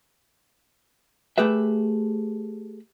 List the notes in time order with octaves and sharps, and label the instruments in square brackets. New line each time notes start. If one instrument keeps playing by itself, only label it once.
[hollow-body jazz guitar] A3 G4 G#4 B4 E5